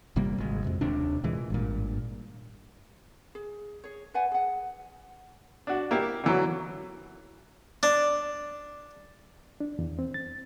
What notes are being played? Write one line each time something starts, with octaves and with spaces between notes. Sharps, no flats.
G1 C3 G3 A#3
G#1 G#3
F2 C3
D#1 D#2 C3 D4
A#2 E3 G#3
G#1 G2 A#2
G#4
G#4 C#5
B4 D5 F#5 G#5
G#4 F#5
D4 F#4
A#3 E4 G4
D3 E3 F#3
D4
D4
E2
C4
A6